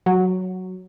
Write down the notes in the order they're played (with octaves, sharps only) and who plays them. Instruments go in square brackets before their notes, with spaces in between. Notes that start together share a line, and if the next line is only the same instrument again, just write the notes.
[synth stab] F#3